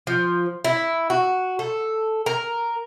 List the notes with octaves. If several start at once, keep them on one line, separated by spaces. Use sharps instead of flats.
F3
E4
F#4
A4
A#4